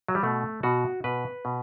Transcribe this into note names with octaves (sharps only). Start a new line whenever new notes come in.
F#3
G3
B2 A3
B2 F#4
B2 B4
B2